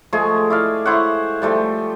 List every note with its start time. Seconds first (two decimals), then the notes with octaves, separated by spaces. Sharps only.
0.13 F3 G#3 A3 G#4
0.50 E4 D5 F5
0.85 E4 C5 C#5 F#5
1.42 F3 G3 A3 C5